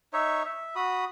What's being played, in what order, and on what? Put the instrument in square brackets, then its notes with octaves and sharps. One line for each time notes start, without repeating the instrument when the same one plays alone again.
[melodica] D#4 C#5 E5
E5
F#4 B5 D#6